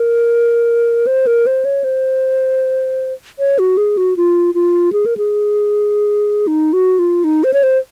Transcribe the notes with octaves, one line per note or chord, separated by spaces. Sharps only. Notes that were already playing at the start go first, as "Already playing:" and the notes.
Already playing: A#4
C5
A#4
C5
C#5
C5
C#5
F#4
G#4
F#4
F4
F4
G#4
A#4
G#4
D#4
F#4
F4
D#4
C5
C#5
C5